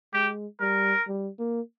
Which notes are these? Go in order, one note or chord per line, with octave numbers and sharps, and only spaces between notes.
G#3 G4
G3 A#4
G3
A#3